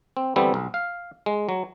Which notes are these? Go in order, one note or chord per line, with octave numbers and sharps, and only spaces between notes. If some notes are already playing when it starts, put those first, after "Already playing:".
C4
D3 E3 G3 B3 C4 A4
B1
F5
G#3
F#3